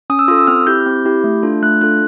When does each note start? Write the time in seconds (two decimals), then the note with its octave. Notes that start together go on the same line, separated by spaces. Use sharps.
0.10 C#4 D#6
0.19 E6
0.28 F4 A4 D#6
0.38 E6
0.47 C4 F6
0.67 E4 G4 G6
0.86 C4
1.05 E4 G4
1.24 A3
1.43 D4 F4 A4
1.62 A3 F#6
1.81 D4 F4 A4 F#6